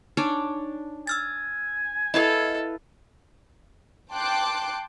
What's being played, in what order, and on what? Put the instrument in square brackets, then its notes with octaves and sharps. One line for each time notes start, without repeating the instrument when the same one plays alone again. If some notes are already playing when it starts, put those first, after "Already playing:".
[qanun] D4 C#5 D5 [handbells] D#4
[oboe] G#5 [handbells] E6 F6 A6
[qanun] E4 B4 F5 [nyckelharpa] A4 [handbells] D#5
[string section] G5 A5 C6 D6 F#6 G6